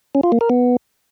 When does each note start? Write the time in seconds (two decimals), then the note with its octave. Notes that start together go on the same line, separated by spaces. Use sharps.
0.15 C#4
0.23 F4
0.32 A#3
0.41 A#4
0.50 B3